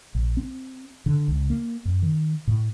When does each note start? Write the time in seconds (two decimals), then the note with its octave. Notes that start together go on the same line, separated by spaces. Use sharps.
0.15 A#1
0.37 C4
1.06 D3
1.28 C#2
1.50 A#3
1.85 F#2
2.02 D#3
2.47 A2